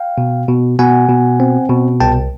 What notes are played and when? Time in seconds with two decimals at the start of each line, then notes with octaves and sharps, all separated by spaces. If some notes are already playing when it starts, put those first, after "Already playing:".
Already playing: F5 G5
0.18 B2
0.48 B2
0.79 B2 F#5 G#5
1.09 B2
1.40 C4
1.70 B2
2.00 C2 G5 A5